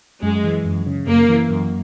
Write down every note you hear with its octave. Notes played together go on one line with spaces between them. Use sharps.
F#2 G#3
E3
F#2
C#3
F#2 A#3
E3
F#2